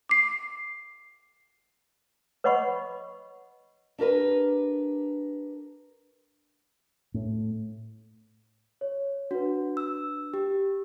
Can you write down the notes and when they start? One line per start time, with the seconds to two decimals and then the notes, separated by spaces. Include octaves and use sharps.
0.09 D6 C7
2.44 B4 C#5 D#5 F#5 B5 C#6
3.98 D4 G4 A#4 B4
7.14 A2
8.81 C#5
9.31 D4 F#4 B4
9.77 E6
10.34 G4